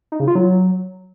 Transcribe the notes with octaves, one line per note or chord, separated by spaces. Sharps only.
D#4
C#3
F4
F#3